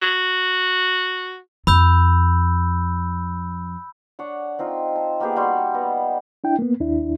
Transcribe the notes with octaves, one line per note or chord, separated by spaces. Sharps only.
F#4
F2 B5 E6 G6
D4 C#5 F#5
C4 D#4 F4
A5
A#3 B3 G4 G#4
G3 F#4 C6
B3 D#5 F5
D4 E4 G5
A#3 B3
D#2 D4 E4